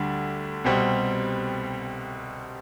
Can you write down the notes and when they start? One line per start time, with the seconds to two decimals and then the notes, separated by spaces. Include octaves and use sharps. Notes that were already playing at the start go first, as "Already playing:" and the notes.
Already playing: D2 D3 G3 D4
0.64 C2 B2 G3 C4